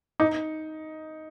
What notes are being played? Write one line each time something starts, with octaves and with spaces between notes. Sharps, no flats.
D#4